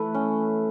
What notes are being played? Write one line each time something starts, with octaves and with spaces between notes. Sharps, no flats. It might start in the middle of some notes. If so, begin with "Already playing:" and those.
Already playing: E3 A3 B4
C#4